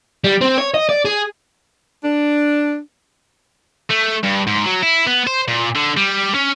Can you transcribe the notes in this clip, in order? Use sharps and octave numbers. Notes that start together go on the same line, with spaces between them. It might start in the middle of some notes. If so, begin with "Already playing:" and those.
G3
C4
C#5
D#5
D5
G#4
D4
A3
G2
G#2
F#3
E4
B3
C5
A#2
D3
G3
C#4